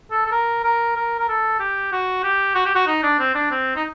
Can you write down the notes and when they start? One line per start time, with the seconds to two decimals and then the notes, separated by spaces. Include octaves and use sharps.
0.11 A4
0.26 A4
0.32 A#4
0.64 A#4
0.96 A#4
1.19 A#4
1.28 A4
1.60 G4
1.92 F#4
2.24 G4
2.55 F#4
2.66 G4
2.75 F#4
2.87 D#4
3.03 D4
3.19 C4
3.35 D4
3.51 C4
3.76 D#4